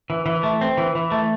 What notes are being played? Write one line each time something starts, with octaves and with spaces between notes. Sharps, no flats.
E3
E3
A3
C4
E3
E3
A3